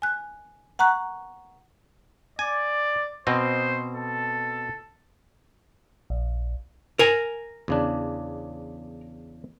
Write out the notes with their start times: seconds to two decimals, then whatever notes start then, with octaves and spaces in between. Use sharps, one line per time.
0.02 G#5 F#6
0.79 F#5 A#5 C#6 F#6
2.39 D5 G#5
3.27 B2 C4 C5 D#5
3.95 A4
6.10 A#1
6.99 A#4 G#5
7.68 E2 C#3 D4